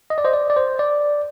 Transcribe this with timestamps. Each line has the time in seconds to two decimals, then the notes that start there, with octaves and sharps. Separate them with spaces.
0.10 D#5
0.18 D5
0.25 C5 D#5
0.34 D5
0.50 D5
0.57 C5
0.79 D5